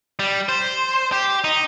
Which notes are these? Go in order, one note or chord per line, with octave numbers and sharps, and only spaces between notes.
G3
C5
G4
D#4